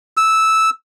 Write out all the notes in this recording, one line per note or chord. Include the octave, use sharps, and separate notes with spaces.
E6